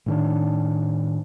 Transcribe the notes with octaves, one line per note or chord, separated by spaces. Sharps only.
A2 D#3 D4